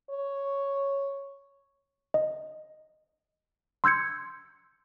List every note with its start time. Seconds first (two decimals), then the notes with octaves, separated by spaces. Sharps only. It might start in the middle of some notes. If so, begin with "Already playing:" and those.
0.10 C#5
2.14 D#5
3.84 C6 E6 G6 G#6 C#7